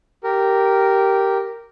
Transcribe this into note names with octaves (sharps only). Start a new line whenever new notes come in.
G4 A#4